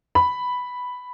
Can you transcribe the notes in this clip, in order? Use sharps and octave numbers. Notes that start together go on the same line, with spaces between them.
B5